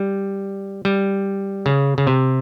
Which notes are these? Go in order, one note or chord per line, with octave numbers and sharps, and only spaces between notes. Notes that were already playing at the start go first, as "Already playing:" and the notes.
Already playing: G3
G3
C#3
C#3
C3